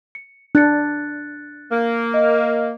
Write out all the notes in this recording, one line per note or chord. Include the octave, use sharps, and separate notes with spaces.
C#7
D4 F#6 A6 C#7
A#3
D#5